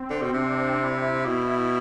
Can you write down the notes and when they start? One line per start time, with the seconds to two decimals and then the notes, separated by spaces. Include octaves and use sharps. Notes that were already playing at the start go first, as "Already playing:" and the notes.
Already playing: C4
0.10 D3
0.22 B2
0.33 C3 D4
0.80 E4
1.25 B2 E4